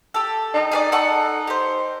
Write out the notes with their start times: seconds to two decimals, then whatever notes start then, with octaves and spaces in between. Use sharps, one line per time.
0.14 G4 A4
0.54 D#4
0.71 G#4 B4 D5
0.92 A4 F#5 C#6
1.47 G4 C5